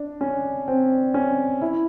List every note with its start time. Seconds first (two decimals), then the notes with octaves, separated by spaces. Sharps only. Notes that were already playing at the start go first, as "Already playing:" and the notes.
Already playing: D4
0.21 C#4
0.68 C4
1.14 C#4
1.61 E4